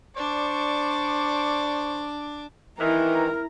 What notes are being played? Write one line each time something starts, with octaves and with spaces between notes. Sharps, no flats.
D4 C5 D5 C#6 D6
D#3 E3 E4 A#4 A#5